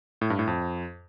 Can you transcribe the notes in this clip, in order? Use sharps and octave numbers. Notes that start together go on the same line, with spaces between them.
A2
G2
A2
F2